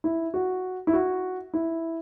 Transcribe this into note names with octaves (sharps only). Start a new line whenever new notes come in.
E4
F#4
E4
F#4
E4